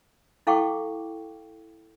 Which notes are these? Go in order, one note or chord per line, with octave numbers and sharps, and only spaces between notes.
E4 A4 F5 G5 C#6 D6